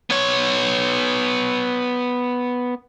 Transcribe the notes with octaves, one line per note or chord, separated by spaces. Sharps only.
B3 C#5